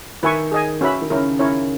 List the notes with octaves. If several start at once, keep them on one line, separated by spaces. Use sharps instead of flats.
D#3 B4 E5 G#5 C#6
G#4 D#5 G#5
C#4 F#4 B4 E5 B5
D#3
C#3 C#4 E4 A#4
C#4 E4 A#4 C#5